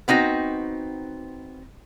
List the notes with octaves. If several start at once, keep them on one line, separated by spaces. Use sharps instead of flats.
B3 C4 D#4 F#4